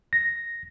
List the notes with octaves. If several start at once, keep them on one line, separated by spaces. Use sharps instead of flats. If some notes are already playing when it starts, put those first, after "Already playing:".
A#6